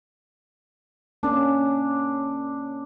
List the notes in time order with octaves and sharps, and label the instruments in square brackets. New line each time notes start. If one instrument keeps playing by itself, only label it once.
[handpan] A#3 C#4 [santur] D4